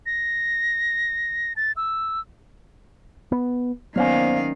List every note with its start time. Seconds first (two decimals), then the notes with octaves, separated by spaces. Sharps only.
0.06 A#6
1.57 A6
1.77 E6
3.32 B3
3.96 D#3 F#3 A#3 B3 C#4 C5 D5 F5